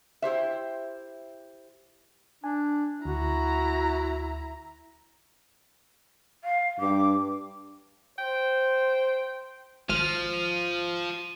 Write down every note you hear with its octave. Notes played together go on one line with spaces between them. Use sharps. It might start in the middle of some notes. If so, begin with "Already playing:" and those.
E4 G4 C5 E5
D4 G#5
D2 E4 F#4 A#5
F5
G2 D6
C5 G5
G#1 F3 F6 D#7